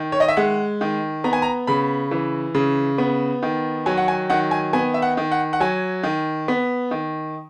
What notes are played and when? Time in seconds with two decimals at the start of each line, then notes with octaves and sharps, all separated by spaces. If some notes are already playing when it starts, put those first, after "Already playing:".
Already playing: D#3
0.12 C#5
0.20 D#5
0.28 E5
0.37 G#3 F#5
0.81 D#3
1.24 B3 A#5
1.33 G#5
1.42 A#5
1.67 C#3 B5
2.11 E3
2.55 C#3
2.98 B3
3.43 D#3
3.86 F#3 G#5
3.97 F#5
4.08 G#5
4.30 D#3 F#5
4.51 G#5
4.73 B3 G#5
4.94 E5
5.02 F#5
5.17 D#3
5.32 F#5
5.53 F#5
5.60 F#3 G#5
6.03 D#3
6.48 B3
6.91 D#3